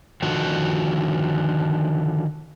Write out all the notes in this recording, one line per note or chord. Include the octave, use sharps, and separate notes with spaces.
D3 D#3 F3 F#4